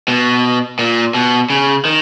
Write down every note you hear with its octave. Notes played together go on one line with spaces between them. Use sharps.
B2
A#2
B2
C#3
D#3